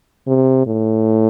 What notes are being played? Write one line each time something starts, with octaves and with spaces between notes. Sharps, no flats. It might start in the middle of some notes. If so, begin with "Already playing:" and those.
C3
A2